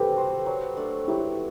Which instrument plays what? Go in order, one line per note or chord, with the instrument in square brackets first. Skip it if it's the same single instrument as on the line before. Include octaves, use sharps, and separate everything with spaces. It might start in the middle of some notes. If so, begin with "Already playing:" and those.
Already playing: [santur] C4 [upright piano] G4 A4 B4
[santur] F#4 C5
F#3
A3 D4
[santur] F#3 [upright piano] E4 G4